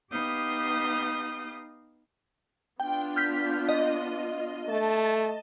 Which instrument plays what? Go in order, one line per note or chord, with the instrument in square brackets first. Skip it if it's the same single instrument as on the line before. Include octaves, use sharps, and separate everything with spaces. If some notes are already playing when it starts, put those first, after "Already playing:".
[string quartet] B3 D#4 G4 F5 D#6 G6
[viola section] B3 D4 F4 [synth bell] G5
[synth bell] F6 G6 B6
D#5
[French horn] A3 [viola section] A5